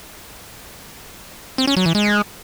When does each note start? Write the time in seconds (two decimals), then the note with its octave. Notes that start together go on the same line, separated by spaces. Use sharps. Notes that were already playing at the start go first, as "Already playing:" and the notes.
1.58 C4
1.67 C#4
1.77 F#3
1.86 E3
1.95 G#3